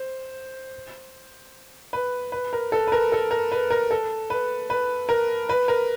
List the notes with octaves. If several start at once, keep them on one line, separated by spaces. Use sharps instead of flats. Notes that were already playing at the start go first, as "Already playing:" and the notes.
Already playing: C5
B4
B4
A#4
A4
B4
A#4
A4
A#4
B4
A#4
A4
B4
B4
A#4
B4
A#4